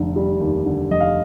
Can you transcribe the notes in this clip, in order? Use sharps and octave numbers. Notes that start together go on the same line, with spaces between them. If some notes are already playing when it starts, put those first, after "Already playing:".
Already playing: F1 D3
G3
D#2
D3
F1 D#5
F5